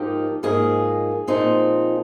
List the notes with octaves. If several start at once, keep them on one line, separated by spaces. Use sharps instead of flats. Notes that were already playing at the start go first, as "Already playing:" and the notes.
Already playing: G#2 F3 A#3 D#4 G4
G#2 F3 A#3 D#4 G#4
A#2 F3 C4 D#4